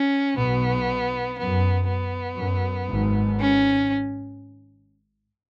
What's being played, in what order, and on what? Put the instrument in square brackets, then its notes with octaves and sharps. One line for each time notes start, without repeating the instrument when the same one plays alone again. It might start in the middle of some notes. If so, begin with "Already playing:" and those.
Already playing: [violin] C#4
[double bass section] B1 B2 [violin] B3
[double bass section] F#2 [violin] B3
[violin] B3
[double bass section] F#2
G#1 G#2
[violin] C#4